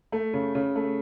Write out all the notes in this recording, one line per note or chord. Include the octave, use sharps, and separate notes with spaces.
A3
C#3
C#3
A3